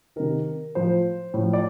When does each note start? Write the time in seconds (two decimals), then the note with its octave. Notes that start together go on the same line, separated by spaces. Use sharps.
0.16 C3 D#3 A#4
0.75 A2 F3 C5
1.34 A2 F3
1.53 D5